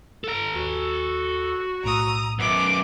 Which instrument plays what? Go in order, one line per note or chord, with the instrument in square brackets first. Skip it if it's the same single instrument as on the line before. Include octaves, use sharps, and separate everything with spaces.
[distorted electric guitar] A4 A#5
[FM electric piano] D#2 [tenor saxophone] F#4
[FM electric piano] B1 A2 E6 [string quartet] A#5 D#6
[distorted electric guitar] F#2 B3 [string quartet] D6